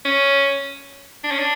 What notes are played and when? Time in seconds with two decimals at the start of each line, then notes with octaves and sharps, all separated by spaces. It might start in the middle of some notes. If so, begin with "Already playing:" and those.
0.05 C#4
1.24 D4
1.31 C#4
1.39 D4